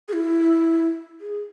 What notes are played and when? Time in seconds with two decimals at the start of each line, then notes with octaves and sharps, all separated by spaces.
0.08 G#4
0.13 E4
1.20 G#4